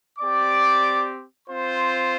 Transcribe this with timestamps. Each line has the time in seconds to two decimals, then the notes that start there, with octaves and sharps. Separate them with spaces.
0.19 C4 G4 D5 D6
1.48 C4 F4 C5 C6